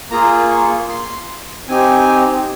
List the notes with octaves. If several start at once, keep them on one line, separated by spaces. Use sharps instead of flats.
A#3 F4 G#4 A#5
C#6
C6
C4 D#4 G4 G#5